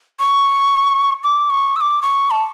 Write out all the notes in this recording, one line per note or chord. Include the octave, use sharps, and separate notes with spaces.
C#6
D6
C#6
E6
D6
C#6
A5